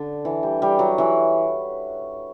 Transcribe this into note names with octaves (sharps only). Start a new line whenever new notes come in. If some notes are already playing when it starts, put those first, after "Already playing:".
Already playing: D3
E3
G3
G3
F#3
E3